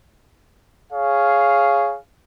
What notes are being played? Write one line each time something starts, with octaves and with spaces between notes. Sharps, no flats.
G#4 C#5 F5